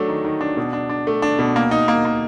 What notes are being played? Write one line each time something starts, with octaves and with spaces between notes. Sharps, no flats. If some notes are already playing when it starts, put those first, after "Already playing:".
Already playing: F#3 A3 D4
D#3
D#3
D4
B2
D4
D4
A3
D4
B2
A#3
D#4
A#3
A#3